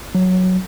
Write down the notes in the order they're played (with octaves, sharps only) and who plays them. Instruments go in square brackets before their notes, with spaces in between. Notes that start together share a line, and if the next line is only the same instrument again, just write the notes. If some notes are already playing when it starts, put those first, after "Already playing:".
[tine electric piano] F#3